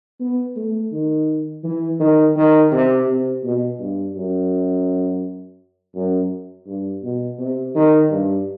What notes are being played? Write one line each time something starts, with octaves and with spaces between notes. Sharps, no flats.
B3
A3
D#3
E3
D#3
D#3
C3
C3
B2
G2
F#2
F#2
G2
B2
C3
D#3
G2